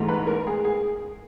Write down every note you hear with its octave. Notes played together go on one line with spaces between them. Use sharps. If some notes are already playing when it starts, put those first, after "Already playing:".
Already playing: G#2 E3 A3
B4
A#4
G#4
G#4